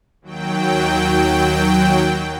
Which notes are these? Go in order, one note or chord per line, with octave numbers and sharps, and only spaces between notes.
D#2 F#3 G5